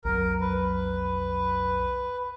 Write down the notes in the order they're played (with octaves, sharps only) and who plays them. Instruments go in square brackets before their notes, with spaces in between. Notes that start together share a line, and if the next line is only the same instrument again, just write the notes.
[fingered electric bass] B1 F2 F#3 [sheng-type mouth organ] A#4
[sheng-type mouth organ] B4